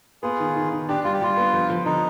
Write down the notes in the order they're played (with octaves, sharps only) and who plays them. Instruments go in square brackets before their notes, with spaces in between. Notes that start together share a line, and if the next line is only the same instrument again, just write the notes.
[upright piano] B3 [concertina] F4 G#4
[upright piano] D#3
D#3
D#3
[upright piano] D4 [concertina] G4
[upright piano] G3 [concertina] F4
[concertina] G4
[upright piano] G3 [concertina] F4
[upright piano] B3
F3
F3
[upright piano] D3 [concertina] D#4